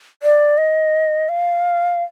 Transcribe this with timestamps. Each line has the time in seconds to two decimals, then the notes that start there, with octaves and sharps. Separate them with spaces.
0.23 D5
0.58 D#5
1.29 F5